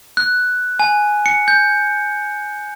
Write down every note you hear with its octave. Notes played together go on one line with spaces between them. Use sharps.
F#6
G#5
C#7
G6